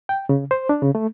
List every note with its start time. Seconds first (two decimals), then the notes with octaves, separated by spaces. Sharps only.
0.09 G5
0.29 C#3
0.51 C5
0.69 D4
0.82 C#3
0.95 A3